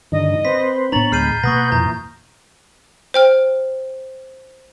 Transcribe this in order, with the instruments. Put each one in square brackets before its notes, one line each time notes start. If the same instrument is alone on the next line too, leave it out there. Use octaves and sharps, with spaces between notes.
[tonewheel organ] G2 D3 D#3 [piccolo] D#5
[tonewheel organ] C4 B4 C5 [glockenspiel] B6
[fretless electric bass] A2 B3 D4 [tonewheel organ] C#5 [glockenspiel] A#5 A6 [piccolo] F#7
[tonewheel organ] D2 G#3 B5 [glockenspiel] F6 C7 D#7 [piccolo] G6
[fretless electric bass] B2 A#3 [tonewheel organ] B4 F#5 [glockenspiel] C#6 D#6 A#6
[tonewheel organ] F2 A#2 E3 [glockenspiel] A#5
[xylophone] C5 G5 F6